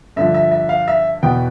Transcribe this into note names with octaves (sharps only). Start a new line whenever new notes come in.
G2 D3 F3 E5
E5
E5
F5
E5
E2 B2 B3 G5